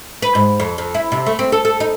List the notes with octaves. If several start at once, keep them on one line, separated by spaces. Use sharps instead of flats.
B4
G#2
F2
F2
E4
C3
A3
C4
A4
A4
D#4